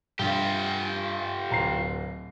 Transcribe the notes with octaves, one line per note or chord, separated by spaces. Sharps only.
G2 F4 G4
D1 A#5 C7